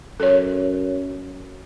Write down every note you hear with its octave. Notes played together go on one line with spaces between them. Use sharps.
F#2 A4 C#5